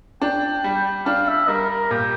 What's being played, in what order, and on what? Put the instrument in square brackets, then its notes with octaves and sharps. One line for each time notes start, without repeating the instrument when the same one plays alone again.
[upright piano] D4 [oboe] G5
[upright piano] G3
[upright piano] D4 [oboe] F5
[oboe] E5
[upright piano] G3 [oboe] A#4
[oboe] A#4
[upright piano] A#2 [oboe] G4